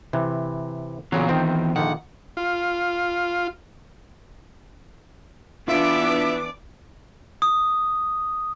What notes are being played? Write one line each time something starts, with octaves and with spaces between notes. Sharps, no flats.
C3 E3
A#2 C#3 E3 F#3 B3 F4
D#3 C4
A#1 D3 D#3 F#5
F4
E3 B3 D4 F4 D5 E5 D6
D#6